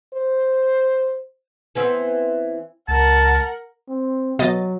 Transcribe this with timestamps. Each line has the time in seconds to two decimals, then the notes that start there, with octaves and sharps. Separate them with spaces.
0.14 C5
1.75 E3 B3 C4
2.88 C#2 A#4 F#5 A5
3.89 C4
4.39 B2 F#3 D#5 A6